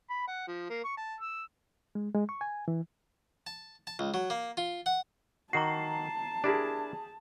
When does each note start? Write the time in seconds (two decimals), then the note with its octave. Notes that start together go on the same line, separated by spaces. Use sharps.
0.10 B5
0.28 F#5
0.47 F3
0.70 A#3
0.84 C#6
0.97 A5
1.21 E6
1.95 G#3
2.15 G#3
2.29 C#6
2.41 G#5
2.68 E3
3.47 A5
3.87 A5
3.99 C#2
4.14 F#3
4.30 A#3
4.57 F4
4.86 F#5
5.53 D#3 F#4 A5 A#5 C7
6.44 D4 E4 G4 G#4 A#4